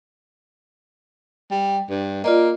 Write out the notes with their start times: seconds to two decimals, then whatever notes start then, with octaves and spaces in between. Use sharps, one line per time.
1.51 G3
1.90 G2
2.24 A#3 F4 D5 D#5